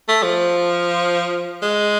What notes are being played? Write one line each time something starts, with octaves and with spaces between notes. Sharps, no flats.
A3
F3
G#3